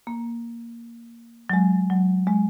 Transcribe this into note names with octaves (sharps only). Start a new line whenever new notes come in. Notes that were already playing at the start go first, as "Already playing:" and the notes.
A#3
F#3
G#3
F#3
G#3